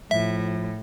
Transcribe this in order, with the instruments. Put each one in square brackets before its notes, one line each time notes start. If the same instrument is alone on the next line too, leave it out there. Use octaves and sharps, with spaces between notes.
[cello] A2 [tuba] F3 [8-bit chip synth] E5